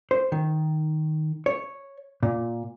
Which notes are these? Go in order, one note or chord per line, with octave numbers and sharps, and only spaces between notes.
C5
D#3
C#5
A#2